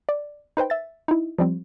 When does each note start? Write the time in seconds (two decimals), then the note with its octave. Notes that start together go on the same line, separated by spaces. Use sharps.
0.09 D5
0.57 D#4 B4 C5 G5
0.70 E5 A6
1.08 D#4 E4
1.39 F3 G3 C4